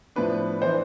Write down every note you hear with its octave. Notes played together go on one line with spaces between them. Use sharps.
A2 F3 B3 D4 B4
E3 B3 D4 C5